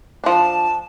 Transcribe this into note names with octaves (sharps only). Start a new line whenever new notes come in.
F3 D4 A5